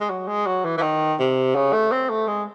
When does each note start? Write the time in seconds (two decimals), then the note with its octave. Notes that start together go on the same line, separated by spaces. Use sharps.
0.01 G#3
0.10 F#3
0.27 G#3
0.46 F#3
0.65 E3
0.78 E3
0.82 D#3
1.19 C3
1.55 C#3
1.73 A3
1.92 C4
2.09 A3
2.27 G#3